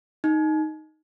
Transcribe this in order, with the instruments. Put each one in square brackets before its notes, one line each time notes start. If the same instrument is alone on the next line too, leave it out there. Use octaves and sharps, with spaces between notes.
[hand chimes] D#4